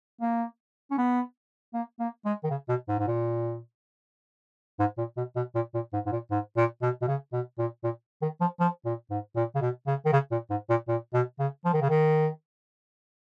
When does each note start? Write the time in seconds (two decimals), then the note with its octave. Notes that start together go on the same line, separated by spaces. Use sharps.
0.21 A#3
0.91 C#4
0.98 B3
1.74 A#3
2.00 A#3
2.25 G#3
2.44 D#3
2.50 C#3
2.69 B2
2.88 G#2
2.99 G#2
3.08 A#2
4.79 G#2
4.98 A#2
5.17 B2
5.36 B2
5.55 A#2
5.74 A#2
5.93 G#2
6.06 G#2
6.12 A#2
6.31 G#2
6.57 A#2
6.82 B2
7.02 B2
7.08 C#3
7.33 B2
7.58 A#2
7.84 A#2
8.22 D#3
8.41 F3
8.60 F3
8.85 A#2
9.11 G#2
9.36 A#2
9.55 C#3
9.61 B2
9.87 C#3
10.06 D#3
10.12 C#3
10.31 A#2
10.50 G#2
10.70 A#2
10.88 A#2
11.14 B2
11.40 C#3
11.65 F3
11.73 D#3
11.81 C#3
11.90 D#3